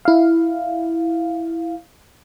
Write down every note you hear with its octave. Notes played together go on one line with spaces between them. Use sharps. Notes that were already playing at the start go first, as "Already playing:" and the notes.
E4 F5